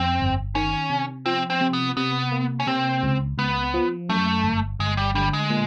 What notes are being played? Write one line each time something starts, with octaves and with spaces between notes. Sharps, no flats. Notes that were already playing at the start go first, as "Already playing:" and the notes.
Already playing: F2 C4
G1
D#3 C#4
C3
F3 C4
C4
C3
B3
C3 B3
A#3
C#4
C3 C4
C#2
C#2 B3
F3
F#2 A3
G1
G1 G#3
G3
D3 G3
G#3
A#2